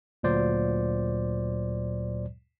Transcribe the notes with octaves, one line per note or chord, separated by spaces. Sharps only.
D2 A#2 F#3 C5 D5